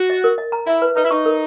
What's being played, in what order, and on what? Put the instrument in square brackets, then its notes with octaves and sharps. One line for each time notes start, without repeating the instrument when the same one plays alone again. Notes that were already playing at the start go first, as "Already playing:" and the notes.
Already playing: [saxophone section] F#4
[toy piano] D#5
A#4
D#5
A#5
[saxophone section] E4 [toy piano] E5
[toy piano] B4
[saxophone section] D#4 [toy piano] B4
[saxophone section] E4
[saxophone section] D#4 [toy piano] C#6
[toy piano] A#4